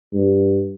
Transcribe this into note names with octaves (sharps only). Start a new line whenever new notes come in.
G2